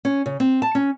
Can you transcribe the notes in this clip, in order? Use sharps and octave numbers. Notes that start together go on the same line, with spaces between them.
C#4
C#3
C4
A5
C#4